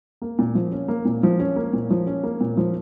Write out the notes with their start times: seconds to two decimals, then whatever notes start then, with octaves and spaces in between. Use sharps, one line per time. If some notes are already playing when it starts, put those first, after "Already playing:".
0.22 A#3
0.39 A#2
0.55 F3
0.72 C#4
0.88 A#3
1.05 A#2
1.23 F3
1.39 C#4
1.56 A#3
1.73 A#2
1.90 F3
2.07 C#4
2.23 A#3
2.41 A#2
2.57 F3